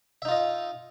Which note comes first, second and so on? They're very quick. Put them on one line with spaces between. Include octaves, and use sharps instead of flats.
E5 D#4 F4 D#5